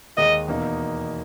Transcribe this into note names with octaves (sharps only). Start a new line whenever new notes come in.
D#2 D#3 G#3 D#4 D#5
E2 B2 A#3 D#4